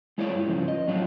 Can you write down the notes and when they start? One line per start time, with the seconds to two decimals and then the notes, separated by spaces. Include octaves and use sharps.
0.18 G#3 E4 F4 C#5 D5
0.33 G2
0.46 G#2 C#3 E3 F3
0.68 D#5
0.87 A2 F#3 C#4 D4 F4